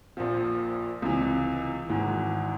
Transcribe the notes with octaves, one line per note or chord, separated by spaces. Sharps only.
A#1 A#2 F3
C#2 C3 E3
G#1 G#2 E3